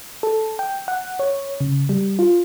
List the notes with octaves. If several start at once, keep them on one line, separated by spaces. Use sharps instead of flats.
A4
G5
F#5
C#5
C#3
G3
F4